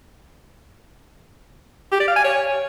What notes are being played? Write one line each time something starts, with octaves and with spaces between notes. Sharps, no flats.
G4
D5
F5
G#5
C#5